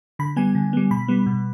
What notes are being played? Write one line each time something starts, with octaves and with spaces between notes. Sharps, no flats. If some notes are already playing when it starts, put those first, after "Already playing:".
D3 B5
G3 B3 G#5
D3
G3 B3
B2 B5
G3 B3
B2